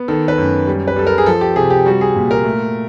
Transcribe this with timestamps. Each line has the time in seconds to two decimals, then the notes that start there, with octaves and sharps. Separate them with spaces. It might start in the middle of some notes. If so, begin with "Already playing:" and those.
Already playing: B3
0.08 D#3 A4
0.28 B4
0.38 F#2
0.67 G3
0.88 B4
0.96 G3 A4
1.07 A#4
1.18 G#4
1.26 F3 A4
1.41 G4
1.56 C3 G#4
1.70 G4
1.86 G3 F#4
2.01 G#4
2.16 A#2
2.31 A#4
2.44 A3